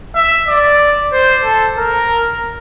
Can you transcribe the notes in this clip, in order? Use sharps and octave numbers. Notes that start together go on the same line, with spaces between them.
E5
D5
C5
A4
A#4